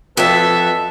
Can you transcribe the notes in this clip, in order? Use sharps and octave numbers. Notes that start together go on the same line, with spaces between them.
F2 A4 B4 E5 A5